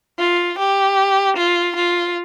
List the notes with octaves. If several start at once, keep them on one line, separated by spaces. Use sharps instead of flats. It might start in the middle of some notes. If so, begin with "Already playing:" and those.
F4
G4
F4
F4